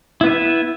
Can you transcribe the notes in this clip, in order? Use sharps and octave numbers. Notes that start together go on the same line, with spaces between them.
B3 E4 B4 E5